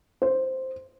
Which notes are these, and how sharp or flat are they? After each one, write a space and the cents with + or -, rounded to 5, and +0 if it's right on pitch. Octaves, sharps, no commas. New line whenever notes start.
C5 +0